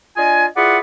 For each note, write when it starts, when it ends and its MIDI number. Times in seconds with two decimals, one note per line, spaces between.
0.17 0.46 62
0.17 0.46 65
0.17 0.46 75
0.17 0.46 80
0.56 0.79 64
0.56 0.79 65
0.56 0.79 68
0.56 0.79 71
0.56 0.79 74
0.56 0.79 78